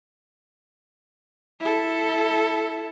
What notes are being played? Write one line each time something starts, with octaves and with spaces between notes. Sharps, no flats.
E4 A4